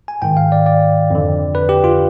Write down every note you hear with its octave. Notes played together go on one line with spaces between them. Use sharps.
G#5
G#2 D#3 G5
F5
D5
D5
F2 D3
B4
G4
F4